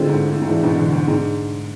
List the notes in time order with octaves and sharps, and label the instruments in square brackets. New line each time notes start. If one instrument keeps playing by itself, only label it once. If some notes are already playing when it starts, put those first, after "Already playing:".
Already playing: [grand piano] A2 [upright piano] D3 G#3 C4 F4
[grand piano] G#2
A2
G#2
[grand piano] A2 [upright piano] E3 G#3 D4
[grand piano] G#2 B2
B2 D3
G#2
[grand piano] G#2 [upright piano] G#3 D4 G#4